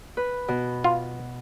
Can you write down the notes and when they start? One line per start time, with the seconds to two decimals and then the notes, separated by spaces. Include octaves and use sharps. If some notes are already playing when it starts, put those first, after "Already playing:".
0.17 B4
0.48 B2
0.84 F4